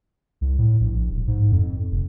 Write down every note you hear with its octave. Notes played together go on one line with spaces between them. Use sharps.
C2
A2
A#1
D#1
G#2
F2
F1